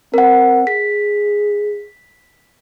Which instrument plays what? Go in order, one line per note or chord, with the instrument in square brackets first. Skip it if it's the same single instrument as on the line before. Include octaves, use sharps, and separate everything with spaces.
[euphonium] C4 [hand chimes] A#4 F#5
[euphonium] G#4 [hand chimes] B6